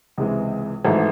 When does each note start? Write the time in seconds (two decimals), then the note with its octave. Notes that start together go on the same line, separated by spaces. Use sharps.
0.18 C#2 C3 E3 G#3
0.85 G#1 G#2 E3 A3